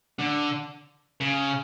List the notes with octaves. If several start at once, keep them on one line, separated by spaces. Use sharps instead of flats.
D3
C#3